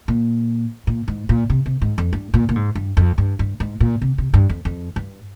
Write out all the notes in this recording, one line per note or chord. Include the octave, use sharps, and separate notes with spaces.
A#2
A#2
G#2
A#2
C3
C3
G#2
F2
G2
A#2
A#2
G#2
G2
F2
G2
G2
G#2
A#2
C3
C3
G2
F2
F2
G2